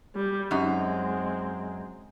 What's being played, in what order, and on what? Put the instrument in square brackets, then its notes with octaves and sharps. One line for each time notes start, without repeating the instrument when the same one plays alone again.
[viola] G3
[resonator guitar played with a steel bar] F#2 D#4 [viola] G#3 C4